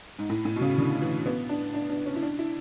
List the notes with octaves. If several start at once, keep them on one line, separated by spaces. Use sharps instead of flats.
G#2
A2
A2
B2
C#3
D3
E3
B3
D4
D4
D4
C#4
E4
D4
E4